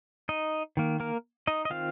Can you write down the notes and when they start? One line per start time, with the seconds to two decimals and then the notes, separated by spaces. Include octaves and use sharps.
0.29 D#4 D#5
0.77 D#3 A#3
1.00 A#3 A#4
1.47 D#4 D#5
1.65 D#5
1.70 D#3 C4 F4 F5